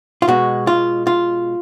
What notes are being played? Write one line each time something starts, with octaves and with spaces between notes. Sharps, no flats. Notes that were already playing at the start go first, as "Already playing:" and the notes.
F4
B2 G#3 F#4
F4
F4